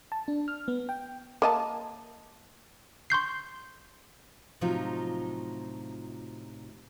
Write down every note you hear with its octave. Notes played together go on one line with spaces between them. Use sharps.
A5
D4
F6
B3
G5
A#3 D#5 A5
C6 C#6 G6 C7
A2 C3 F3 F#3 D#4 F4